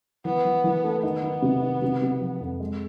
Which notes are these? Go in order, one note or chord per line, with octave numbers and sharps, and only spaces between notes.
E3 B3
E3
E3
A3
D#3 B3
D#3
C3
D#3
C3
C3
F3
F2
G#3